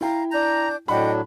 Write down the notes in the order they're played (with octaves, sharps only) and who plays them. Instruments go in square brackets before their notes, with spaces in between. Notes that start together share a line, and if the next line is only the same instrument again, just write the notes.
[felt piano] E4 G5 [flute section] F5 A#5
[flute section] D4 G6 [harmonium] A#5
[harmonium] A2 F#3 D4 [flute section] D#5 F#5 G5 [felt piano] B5